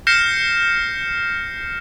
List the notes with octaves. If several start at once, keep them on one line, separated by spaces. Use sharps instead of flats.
F6 G6 A#6 C7 C#7 E7